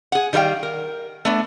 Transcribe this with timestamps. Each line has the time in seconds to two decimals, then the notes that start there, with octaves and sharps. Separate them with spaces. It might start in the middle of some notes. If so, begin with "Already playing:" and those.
0.12 G#4 F#5
0.33 D#3 G3 A4 F5 G5
0.63 A#4
1.25 A3 B3 D4